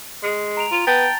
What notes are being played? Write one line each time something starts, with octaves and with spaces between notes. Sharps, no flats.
G#3
A#5 D7 F7
F4
B3 G5 A5 A6